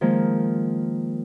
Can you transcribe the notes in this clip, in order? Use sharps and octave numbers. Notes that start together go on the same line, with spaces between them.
D#3 F3 G#3 A#3